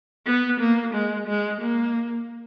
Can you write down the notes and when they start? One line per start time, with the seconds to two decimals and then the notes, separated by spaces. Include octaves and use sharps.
0.26 B3
0.60 A#3
0.94 G#3
1.27 G#3
1.61 A#3